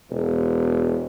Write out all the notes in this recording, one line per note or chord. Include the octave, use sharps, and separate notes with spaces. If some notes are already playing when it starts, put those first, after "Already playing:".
E1